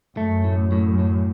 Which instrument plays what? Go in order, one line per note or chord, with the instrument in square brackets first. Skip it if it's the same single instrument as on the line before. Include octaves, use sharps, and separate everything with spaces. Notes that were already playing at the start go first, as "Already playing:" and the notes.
[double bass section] F#2 [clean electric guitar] A3
[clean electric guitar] A2
A2
A2